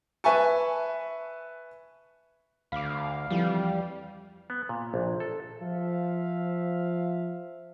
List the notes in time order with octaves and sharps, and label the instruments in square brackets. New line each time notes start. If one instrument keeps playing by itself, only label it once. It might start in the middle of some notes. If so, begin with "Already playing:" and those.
[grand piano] B4 E5 G#5 A5 C#6
[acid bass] D2 [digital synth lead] F5 [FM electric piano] B5 D6
[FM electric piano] F2 E3 [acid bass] G3
[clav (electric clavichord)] B3
A#2
A#1
A4
[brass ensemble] F3 E5 F5